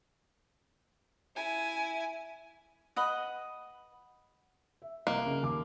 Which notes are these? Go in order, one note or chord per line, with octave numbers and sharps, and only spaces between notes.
E4 G#5
B4 D#5 F#5
E5
C2 A#3 D#5
C#3
D#2 D6